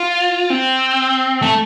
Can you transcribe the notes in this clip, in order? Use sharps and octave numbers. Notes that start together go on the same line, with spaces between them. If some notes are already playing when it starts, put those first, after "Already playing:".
Already playing: F4
C4
A3